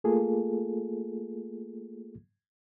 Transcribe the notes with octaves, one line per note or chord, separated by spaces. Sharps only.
A3 A#3 F4 G#4 A4